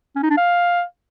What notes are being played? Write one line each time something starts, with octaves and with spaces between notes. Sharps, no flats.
C#4
D#4
D4
F5